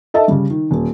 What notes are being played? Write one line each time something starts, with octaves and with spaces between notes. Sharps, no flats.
A4 D#5 E5 A5
C#3 G3
D#3
D#1